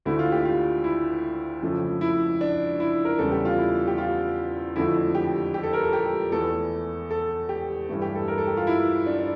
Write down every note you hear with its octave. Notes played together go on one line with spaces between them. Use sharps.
D2 D3 A3 E4
F4
G4
F4
E4
F2 C#3 F3 A3
E4
D4
E4
A#4
E2 C#3 G3 A4
G4
F4
E4
G4
F4
F2 D3 F3 A3 E4
G4
G4
A4
A#4
A4
G4
E2 E3 A3 A4
A4
G4
G2 E3 A3
G4
A4
A#4
A4
G4
F4
E4
D4
D4